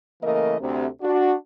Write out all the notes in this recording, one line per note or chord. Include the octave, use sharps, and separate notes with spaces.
C#3 E3 A3 A#3 A#4 D#5
D2 C3
D4 F#4